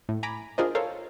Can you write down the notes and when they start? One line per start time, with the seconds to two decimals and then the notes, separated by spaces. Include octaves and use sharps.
0.09 A2
0.23 G#5 A#5 B5 D6
0.58 D4 F4 G#4 A#4 C5 D#5
0.75 A4 A#4 C5 C#5 F5